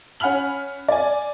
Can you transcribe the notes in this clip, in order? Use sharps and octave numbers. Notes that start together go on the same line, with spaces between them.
C#4 F#5 G#5 B5 F6 F#7
D5 G#5